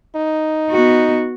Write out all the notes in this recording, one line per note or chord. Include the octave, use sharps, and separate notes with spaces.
D#4
B3 F#4